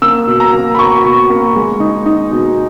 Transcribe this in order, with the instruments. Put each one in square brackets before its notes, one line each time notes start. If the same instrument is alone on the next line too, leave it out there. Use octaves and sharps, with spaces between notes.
[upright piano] A#3 E6
B2
A#5
A#3
B5
B2 C#6
B2
A#3
G#3
D#4
D#4
B2